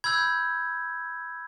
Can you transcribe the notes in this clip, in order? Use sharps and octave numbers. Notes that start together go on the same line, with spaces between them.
B5 E6 G6 G#6